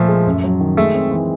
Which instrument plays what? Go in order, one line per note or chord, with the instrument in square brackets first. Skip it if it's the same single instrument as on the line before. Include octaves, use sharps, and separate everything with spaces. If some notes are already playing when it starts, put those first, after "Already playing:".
Already playing: [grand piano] A#2 F3 [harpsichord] A3
[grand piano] G#3
F#2
F#3
D#3
[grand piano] G#3 [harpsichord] A3
[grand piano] C4
E3